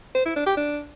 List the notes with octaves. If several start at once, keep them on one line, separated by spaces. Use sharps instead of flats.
C5
E4
D4
G4
D4